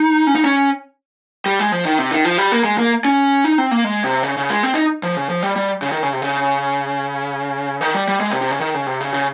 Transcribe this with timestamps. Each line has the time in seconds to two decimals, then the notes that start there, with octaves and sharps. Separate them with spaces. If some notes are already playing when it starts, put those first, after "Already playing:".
Already playing: D#4
0.27 C#4
0.35 D#4
0.45 C#4
1.46 G3
1.59 G#3
1.72 F3
1.85 D#3
1.99 C3
2.11 D#3
2.25 F3
2.38 G3
2.52 A#3
2.64 G#3
2.78 A#3
3.05 C#4
3.44 D#4
3.58 C4
3.71 A#3
3.84 G#3
4.04 C3
4.23 C#3
4.37 C#3
4.50 G#3
4.63 C4
4.74 D#4
5.03 F3
5.17 C#3
5.29 F3
5.43 G3
5.56 G3
5.82 C#3
5.92 D#3
6.03 C#3
6.13 C3
6.22 C#3
7.81 D#3
7.95 G3
8.08 G3
8.20 G#3
8.30 C3
8.41 C3
8.51 C#3
8.61 D#3
8.74 C#3
8.86 C3
9.01 C#3
9.13 C#3